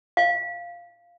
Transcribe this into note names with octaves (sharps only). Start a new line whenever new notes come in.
F5